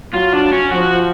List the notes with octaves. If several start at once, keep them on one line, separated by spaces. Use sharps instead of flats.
F#3 F4
D4
C#4
F3 F#4